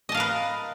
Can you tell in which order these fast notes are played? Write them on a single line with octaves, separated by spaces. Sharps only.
D#5 A5 F5 A#4 B4